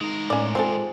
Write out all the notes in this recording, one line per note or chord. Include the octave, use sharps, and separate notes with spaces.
G#3 D#4 A#4
A2 C#4 D5
C4 F4 A4 C5 G#5